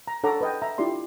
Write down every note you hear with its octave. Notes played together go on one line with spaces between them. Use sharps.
A#5
D4 A4 C#5 F#5 A#5 D6
B4 D#5 G5
E5 A#5
D4 E4 F4 G4 D5 C6